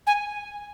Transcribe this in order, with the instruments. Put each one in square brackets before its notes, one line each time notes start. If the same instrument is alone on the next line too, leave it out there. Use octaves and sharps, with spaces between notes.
[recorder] G#5